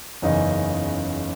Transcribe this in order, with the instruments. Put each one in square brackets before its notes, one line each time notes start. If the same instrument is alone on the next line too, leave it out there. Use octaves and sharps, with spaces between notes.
[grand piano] F#1 E2 C#3 D#4